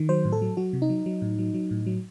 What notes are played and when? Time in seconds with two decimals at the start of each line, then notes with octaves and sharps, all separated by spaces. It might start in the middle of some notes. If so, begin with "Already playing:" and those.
Already playing: D#3
0.09 F#3 C5
0.25 A2
0.32 A4
0.42 F#3
0.57 F#3 F#4
0.73 C3
0.82 D#4
0.89 F#3
1.06 F#3
1.22 A2
1.39 F#3
1.54 F#3
1.71 A2
1.86 F#3